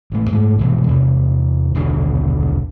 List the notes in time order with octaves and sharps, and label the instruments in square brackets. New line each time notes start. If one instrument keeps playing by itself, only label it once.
[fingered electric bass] A1 A3
G#2 G3 A3
C2 G2 B2 E3
E2 C3
D#1 B1 D3 D4